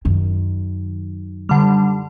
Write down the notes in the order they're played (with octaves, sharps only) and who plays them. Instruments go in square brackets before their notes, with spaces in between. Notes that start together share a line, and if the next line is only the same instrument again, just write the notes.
[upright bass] F#2 D#3
[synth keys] D3 G3